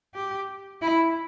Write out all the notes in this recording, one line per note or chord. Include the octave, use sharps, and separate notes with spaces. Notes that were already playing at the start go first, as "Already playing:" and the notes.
G4
E4